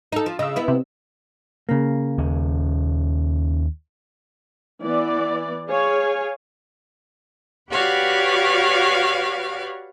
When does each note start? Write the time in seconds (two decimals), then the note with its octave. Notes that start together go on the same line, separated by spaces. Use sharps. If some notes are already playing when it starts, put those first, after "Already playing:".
0.12 D#4 A4
0.26 F3
0.39 C#3 D#5 E6
0.56 B3 E4
0.68 C3
1.69 C#3 A#3
2.18 D#2 C#4
4.82 E3 B3 D5
5.67 G#4 C#5 F5 G#5
7.71 F#4 G4 B4 C#5 D5 F5